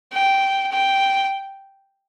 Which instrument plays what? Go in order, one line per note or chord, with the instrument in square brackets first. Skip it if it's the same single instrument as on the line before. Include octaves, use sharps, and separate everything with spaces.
[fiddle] G5
G5